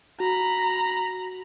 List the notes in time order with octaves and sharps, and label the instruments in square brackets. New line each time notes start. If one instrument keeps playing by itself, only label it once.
[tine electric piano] F#4 [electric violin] A#5 B5